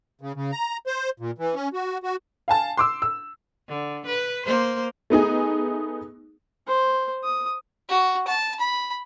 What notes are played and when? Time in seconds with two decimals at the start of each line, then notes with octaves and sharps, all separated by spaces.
0.21 C#3
0.35 C#3
0.52 A#5
0.87 C5
1.20 A#2
1.38 E3
1.55 C#4
1.73 F#4
2.03 F#4
2.48 F5 G#5 A5
2.77 C6 D6 E6
3.02 E6
3.68 D3
4.06 B4
4.46 A#3 C5
5.10 A3 B3 D#4 G#4
6.67 C5
7.24 D#6
7.89 F#4
8.27 A5
8.59 B5